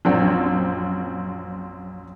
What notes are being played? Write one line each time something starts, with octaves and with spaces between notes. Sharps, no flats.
A#1 F#2 C4